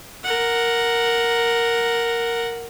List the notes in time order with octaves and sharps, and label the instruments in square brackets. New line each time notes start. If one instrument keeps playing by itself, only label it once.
[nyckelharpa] A#4 F#5